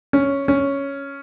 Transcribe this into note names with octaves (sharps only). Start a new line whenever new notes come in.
C#4
C#4